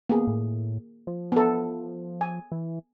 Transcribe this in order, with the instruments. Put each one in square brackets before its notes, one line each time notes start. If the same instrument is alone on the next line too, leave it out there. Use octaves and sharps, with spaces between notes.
[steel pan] A#3 G#4 [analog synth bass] B3
[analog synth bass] A2
F3
[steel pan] B3 A4
G#5
[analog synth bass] E3